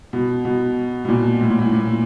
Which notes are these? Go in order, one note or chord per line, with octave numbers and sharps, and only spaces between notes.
B2
B2
B2
A#2
A2
A#2
A2
A#2